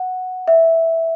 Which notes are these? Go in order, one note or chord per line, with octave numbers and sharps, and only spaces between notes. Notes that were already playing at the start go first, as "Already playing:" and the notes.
Already playing: F#5
E5